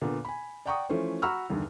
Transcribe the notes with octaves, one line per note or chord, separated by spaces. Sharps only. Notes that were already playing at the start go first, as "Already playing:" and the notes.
A#2 D3 B3
G#5 B5
D5 F#5 G5 A#5 C#6 D#6
E3 F3 A3 C#4 C5
F#4 A#5 B5 C#6 E6 F6
E2 G2 D3 D#3